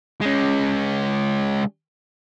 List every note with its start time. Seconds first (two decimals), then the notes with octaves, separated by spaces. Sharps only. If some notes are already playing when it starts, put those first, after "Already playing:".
0.21 G#3 C#4